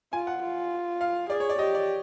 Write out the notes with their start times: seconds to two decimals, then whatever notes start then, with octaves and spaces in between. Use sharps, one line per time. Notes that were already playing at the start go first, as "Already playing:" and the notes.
0.13 F4 G#5
0.27 F#5
0.43 F4
1.01 F5
1.30 G#4 D5
1.40 C#5
1.49 D5
1.59 G4 D#5
1.75 D5